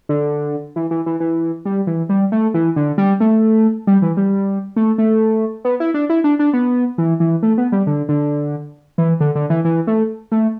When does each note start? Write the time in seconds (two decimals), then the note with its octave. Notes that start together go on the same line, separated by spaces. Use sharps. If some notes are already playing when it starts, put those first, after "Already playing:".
0.09 D3
0.76 E3
0.91 E3
1.06 E3
1.20 E3
1.65 G3
1.87 E3
2.09 G3
2.32 A3
2.54 E3
2.76 D3
2.98 G3
3.20 A3
3.87 G3
4.02 E3
4.17 G3
4.76 A3
4.98 A3
5.65 B3
5.80 E4
5.94 D4
6.10 E4
6.24 D4
6.39 D4
6.53 B3
6.98 E3
7.20 E3
7.43 A3
7.58 B3
7.72 G3
7.87 D3
8.09 D3
8.98 E3
9.20 D3
9.35 D3
9.50 E3
9.65 E3
9.87 A3
10.32 A3